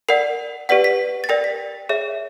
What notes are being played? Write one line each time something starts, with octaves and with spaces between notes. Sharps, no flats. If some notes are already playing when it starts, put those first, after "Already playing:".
A#4 D5 F#5 C7
G4 B4 D5 F#5 B6
B6
A6
A#4 D5 G5 A#6
B6
G#4 C#5 E5